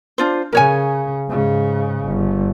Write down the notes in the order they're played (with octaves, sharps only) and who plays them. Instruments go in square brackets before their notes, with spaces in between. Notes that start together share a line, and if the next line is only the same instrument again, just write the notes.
[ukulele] D4 F4 C5
[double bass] C#3 [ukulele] A#4 C#5 G#5
[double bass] G#2 C#3
G1